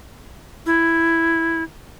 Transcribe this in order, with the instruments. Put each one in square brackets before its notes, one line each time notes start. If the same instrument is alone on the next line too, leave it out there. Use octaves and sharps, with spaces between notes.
[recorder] E4